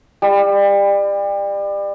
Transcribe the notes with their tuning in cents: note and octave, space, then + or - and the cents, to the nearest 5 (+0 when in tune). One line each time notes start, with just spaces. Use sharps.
G3 +30